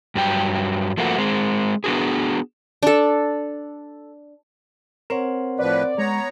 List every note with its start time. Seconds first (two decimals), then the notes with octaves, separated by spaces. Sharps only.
0.15 G2 F#3 G5
0.97 F3 A3 A#3 F#4
1.18 G#3 C4
1.84 B3 D4 F#4 G#4
2.83 D4 A4
5.10 C4 A#4 C5 C#5 F#5
5.60 A2 F3 B4 D5
5.98 G#3 B3 C#5 A#5